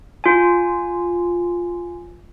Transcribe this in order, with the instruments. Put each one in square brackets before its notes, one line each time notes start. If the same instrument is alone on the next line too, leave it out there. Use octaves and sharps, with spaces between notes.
[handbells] F4 G#5